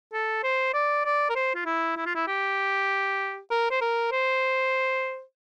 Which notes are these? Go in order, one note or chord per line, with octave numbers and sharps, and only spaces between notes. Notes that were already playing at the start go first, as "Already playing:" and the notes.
A4
C5
D5
D5
A#4
C5
F4
E4
E4
F4
E4
G4
A#4
C5
A#4
C5